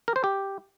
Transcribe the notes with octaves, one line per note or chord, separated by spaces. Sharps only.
A#4
C5
G4